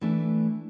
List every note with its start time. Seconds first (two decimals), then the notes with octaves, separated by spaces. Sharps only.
0.01 E3 A3 D4